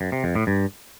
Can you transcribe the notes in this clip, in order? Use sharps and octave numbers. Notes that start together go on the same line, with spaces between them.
F#2
C3
F2
A2
G2